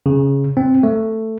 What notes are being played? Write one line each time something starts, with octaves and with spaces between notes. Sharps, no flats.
C#3
C4
A3